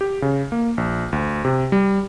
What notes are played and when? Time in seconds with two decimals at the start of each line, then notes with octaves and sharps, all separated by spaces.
0.01 G4
0.22 C#3
0.52 A#3
0.78 A#1
1.12 D2
1.45 C3
1.72 G3